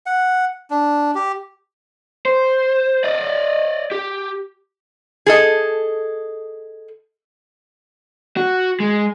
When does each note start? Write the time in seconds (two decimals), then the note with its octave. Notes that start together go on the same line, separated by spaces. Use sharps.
0.06 F#5
0.71 D4
1.15 G4
2.25 C5
3.04 D5 D#5
3.92 G4
5.26 G#4 A4 D#5
8.37 F#4
8.80 G#3